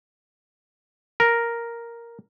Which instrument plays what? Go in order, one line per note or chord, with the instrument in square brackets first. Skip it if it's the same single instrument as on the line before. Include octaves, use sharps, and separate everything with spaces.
[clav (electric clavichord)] A#4